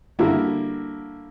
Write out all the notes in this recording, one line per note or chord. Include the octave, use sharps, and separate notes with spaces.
D3 G3 A#3 E4 F#4